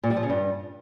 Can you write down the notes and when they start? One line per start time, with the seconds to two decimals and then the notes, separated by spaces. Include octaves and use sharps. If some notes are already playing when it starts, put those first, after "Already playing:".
0.03 A#2
0.10 G3
0.17 F3
0.23 C#3
0.30 G2